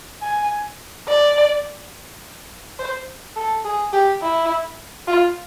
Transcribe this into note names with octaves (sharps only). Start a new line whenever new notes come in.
G#5
D5
C5
A4
G#4
G4
E4
F4